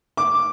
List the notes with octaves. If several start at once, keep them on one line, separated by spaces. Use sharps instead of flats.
D6